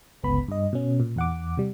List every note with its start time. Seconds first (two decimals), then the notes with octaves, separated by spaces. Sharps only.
0.23 G1 C#2 B3 B5
0.48 G2 D#5
0.73 B2 C#4
1.00 A#2
1.16 E2 F#5 D6
1.57 C3 G3